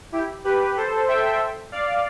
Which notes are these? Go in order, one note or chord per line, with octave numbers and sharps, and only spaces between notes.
E4 G4
G4 B4
A4 C5
E5 G5
D5 F5